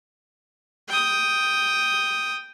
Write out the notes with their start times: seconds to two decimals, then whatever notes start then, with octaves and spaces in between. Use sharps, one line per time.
0.88 G5 D#6